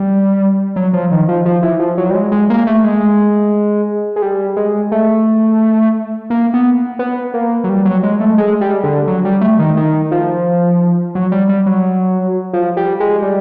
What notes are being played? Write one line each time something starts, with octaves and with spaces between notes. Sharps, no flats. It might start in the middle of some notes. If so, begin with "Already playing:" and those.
Already playing: G3
F#3
F3
D#3
F3
F3
E3
F3
F#3
G3
G#3
G#3
A#3
A3
G#3
G#3
G3
G#3
A3
A#3
B3
B3
A#3
F#3
G3
F#3
G#3
A3
G#3
G3
D3
F#3
G3
A3
D#3
D#3
F3
F#3
G3
G3
F#3
F3
G3
G#3
G3